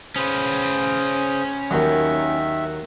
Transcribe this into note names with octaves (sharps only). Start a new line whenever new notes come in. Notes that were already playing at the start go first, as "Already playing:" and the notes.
C#3 C#4 B4 C5 D#6
D#2 D#3 F#3 E5